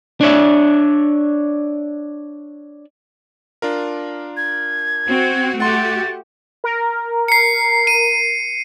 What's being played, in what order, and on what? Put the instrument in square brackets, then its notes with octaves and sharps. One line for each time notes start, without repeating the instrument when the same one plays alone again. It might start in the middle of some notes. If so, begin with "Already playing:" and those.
[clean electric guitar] D4 C#5 E5
[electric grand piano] D4 F4 A#4
[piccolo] G#6
[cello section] C4 F#4
[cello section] A3 F#4 G4 [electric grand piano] F#5 C6 [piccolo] A6
[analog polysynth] A#4
[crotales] C7 C#7
D#7